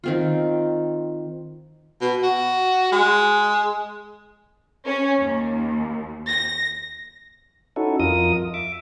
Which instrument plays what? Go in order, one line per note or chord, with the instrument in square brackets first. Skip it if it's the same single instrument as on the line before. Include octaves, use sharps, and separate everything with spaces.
[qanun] D#3 C4 F4
[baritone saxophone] B2
F#4
G#3
[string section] C#4
D#2
A#6
[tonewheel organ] C#4 D#4 E4 F#4 A4
F2 F4 A#4 D#5 D#6
E5 D6